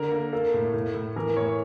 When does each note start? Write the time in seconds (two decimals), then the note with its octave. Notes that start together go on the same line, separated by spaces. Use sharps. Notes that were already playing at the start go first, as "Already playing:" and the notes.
Already playing: D3 A#4
0.12 A#3 A#4
0.33 A#3 A4
0.54 A2
0.74 A2
0.95 A2
1.16 E3 A#4
1.37 A2 C#5